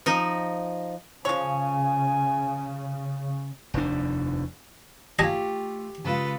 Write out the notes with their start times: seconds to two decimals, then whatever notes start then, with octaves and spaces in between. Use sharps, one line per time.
0.06 F3 D#4
1.25 C#3 F3 G#3 C#5 G#5
3.74 F1 D#2 D4
5.19 A3 F4 G4 D#5 G#5 A5
6.04 C#3 G#3 F4 A4 B4